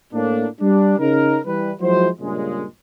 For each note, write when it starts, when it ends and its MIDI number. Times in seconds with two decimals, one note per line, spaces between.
0.13 0.47 45
0.13 0.47 58
0.13 0.47 62
0.61 0.98 55
0.61 0.98 62
0.99 1.39 49
0.99 1.39 63
0.99 1.39 70
1.45 1.72 52
1.45 1.72 55
1.45 1.72 71
1.81 2.08 53
1.81 2.08 54
1.81 2.08 56
1.81 2.08 64
1.81 2.08 66
1.81 2.08 72
2.20 2.65 43
2.20 2.65 46
2.20 2.65 49
2.20 2.65 56